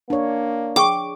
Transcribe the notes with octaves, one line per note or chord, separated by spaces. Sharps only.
A#3 D4 C#5
G#4 G5 C#6 D6